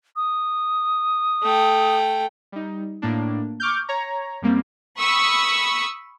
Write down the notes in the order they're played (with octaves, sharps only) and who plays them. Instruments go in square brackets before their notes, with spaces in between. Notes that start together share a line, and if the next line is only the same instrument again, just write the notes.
[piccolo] D#6
[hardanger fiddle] A3 G5
[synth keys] G3 D#4
A2 A#3 D4
C#6 D6 F6 G6
C#5 A#5
F#2 G3 A#3 C4
[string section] B5 C#6 D#6 E6